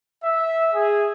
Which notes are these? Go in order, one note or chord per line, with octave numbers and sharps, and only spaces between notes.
E5
G#4